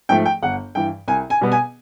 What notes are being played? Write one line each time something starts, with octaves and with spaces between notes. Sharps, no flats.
G#2 F3 A3 G5
G5
G1 F#5
G2 E3 G5
C2 G#5
G#5
B2 G3 B3
G#5